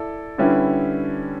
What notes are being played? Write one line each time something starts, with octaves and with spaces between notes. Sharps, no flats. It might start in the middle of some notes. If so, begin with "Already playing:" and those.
Already playing: E4 A4 D5
D3 G3 C#4 E4 B4